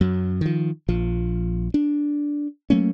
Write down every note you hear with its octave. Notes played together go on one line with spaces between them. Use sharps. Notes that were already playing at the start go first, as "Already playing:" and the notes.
F#2 F#3
D#3 F3
A#1 F3
D4
F#3 A3 A#3 C#4